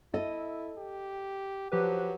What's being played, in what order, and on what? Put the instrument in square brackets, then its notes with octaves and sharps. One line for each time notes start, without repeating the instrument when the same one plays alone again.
[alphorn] E4 [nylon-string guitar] A4 D#5
[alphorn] G4
[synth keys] F3 G4 B4 [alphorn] F#3